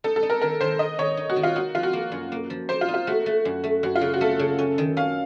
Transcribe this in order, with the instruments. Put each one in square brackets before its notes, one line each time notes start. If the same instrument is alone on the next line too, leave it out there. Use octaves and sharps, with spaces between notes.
[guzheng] D#4 [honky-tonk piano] A4
[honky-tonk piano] A4
[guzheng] D#4
[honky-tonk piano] A#4
[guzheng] D#3 [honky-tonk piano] A#4
[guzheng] D#3 [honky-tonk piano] C5
[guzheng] D#3 [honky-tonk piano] D#5
[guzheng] D#3 [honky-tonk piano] C#5
[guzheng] D#4
[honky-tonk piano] F#4
[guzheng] D#3
[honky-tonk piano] F4
[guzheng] D#4 [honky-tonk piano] F#4
[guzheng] F3 [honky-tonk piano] F4
[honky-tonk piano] F#4
[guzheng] A#3
F#2
A#3
F3
[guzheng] A#3 [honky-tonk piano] C5
[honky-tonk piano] F4
[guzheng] D#4
[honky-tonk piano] F4
[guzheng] A3 [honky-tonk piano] F#4
[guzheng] A3
F#2
A3
[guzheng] F#2 [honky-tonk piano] F#4
[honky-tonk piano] F4
[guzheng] C#3
[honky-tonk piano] F#4
[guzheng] A3 [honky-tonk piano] A4
[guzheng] C#3
C#4
D#3
[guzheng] C#4 [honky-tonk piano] F5